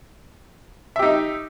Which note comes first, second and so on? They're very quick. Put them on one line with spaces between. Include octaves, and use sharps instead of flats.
E5 G4 D#4